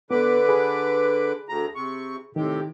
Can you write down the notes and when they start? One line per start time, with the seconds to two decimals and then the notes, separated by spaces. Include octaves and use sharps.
0.11 D3 B3 B4 D6
0.49 G#4 B5
1.49 D2 A#5
1.75 C3 C#6
2.36 A2 C3 D#3 G4